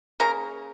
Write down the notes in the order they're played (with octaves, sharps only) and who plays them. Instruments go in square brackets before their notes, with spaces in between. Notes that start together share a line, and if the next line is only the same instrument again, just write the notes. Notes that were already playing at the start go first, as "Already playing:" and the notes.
[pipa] C#3 A#3 A#4